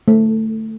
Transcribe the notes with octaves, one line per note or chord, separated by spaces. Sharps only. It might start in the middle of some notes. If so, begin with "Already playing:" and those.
A3